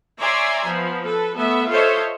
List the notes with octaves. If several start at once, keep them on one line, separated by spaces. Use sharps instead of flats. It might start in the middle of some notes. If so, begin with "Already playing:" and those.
C#5 D5 E5 G#5 A#5 C6
F3 B3
A4 B4
A3 B3 E5
F4 A4 C5 C#5 D#5 E5